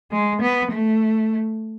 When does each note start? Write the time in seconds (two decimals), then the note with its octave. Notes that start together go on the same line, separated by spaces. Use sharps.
0.11 G#3
0.41 B3
0.71 A3